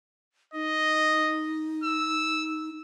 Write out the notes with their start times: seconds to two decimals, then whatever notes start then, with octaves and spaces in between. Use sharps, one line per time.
0.54 D#4 D#5
1.84 E6